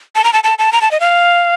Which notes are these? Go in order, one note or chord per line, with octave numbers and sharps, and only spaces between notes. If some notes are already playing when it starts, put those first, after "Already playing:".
A5
A#5
A5
A5
A5
A#5
A5
D#5
F5